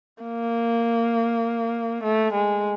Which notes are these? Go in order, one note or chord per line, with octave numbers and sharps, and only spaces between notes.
A#3
A3
G#3